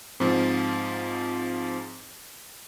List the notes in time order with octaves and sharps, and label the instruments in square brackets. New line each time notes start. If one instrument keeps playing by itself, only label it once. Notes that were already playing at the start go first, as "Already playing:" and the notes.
[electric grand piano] G#2 F3 [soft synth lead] C4